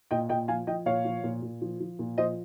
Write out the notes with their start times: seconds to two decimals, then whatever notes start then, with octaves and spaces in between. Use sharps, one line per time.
0.11 A#2 D#5 G5
0.29 A#2 D#5 G5
0.48 F3 F5 G#5
0.67 F3 D#5 G5
0.86 A#2 C#5 F5
1.05 F3
1.24 A#2
1.42 A#2
1.62 F3
1.80 F3
1.99 A#2
2.18 F3 C5 D#5